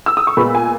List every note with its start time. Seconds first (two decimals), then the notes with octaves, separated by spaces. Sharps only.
0.06 E6
0.17 D#6
0.27 C#6
0.37 A#2 G#3 B3 B5
0.55 G#5